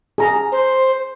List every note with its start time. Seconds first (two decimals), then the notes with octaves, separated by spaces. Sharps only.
0.18 G#4 A#5
0.52 C5